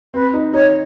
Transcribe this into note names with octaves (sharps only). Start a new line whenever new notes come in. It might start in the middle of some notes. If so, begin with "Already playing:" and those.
C4 B4
D#4
D#4 C#5